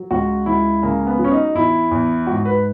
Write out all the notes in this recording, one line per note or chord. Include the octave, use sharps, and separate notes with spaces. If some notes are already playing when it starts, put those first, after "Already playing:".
Already playing: F#3
C#2 F#4
C#2 E4
C#3 A#3
B3
F#3
C#4
D#4
E2 E4
E2
G#2 F#4
B4